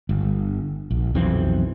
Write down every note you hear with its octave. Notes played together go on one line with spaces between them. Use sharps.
G1
A#1
B1 F2 E3 C4